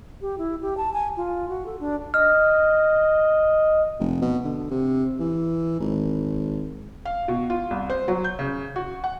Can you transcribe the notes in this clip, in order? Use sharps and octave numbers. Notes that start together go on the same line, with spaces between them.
G4
E4
G4
A5
G#5
F4
F#4
A4
D4
D#5 F6
F1
B2
D3
C3
E3
G#1
F5
B2
F4
C2
C5
F#3
G6
C#3
F#4
F#5